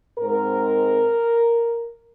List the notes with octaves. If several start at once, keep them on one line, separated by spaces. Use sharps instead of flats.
G#2 G#3 C4 A#4